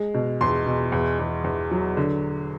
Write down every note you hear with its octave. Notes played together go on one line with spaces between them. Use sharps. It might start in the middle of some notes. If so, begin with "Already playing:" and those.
Already playing: G#3
B2
E2 C6
B2
E2
E2
E2
F#3
D3